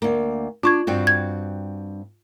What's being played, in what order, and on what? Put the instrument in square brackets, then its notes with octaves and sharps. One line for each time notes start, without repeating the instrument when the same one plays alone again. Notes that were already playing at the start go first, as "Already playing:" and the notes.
[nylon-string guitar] D2 A#3
[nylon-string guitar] D4 [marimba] F4 C#6 G#6
[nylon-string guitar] G2 C4 F#4
[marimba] G#6